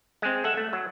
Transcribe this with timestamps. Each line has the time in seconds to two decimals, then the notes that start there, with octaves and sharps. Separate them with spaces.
0.22 G#3 C4
0.44 A4 E5 F#5
0.57 A3
0.73 F#3